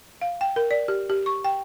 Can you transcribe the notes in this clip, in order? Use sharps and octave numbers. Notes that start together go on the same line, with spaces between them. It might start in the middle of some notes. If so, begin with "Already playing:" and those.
F5
G5
A#4
D5
G4
G4
C#6
G5